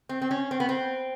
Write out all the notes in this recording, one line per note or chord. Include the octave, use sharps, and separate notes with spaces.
C4
C4
C#4
C4
B3
C4